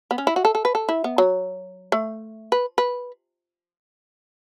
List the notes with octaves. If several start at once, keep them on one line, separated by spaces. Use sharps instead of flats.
B3
C#4
E4
F#4
A4
A4
B4
A4
E4
B3
F#3
A3
B4
B4